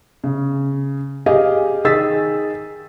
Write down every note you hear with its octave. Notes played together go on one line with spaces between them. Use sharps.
C#3
G4 G#4 D#5 F5 G#5
D#3 G#4 E6 A6 B6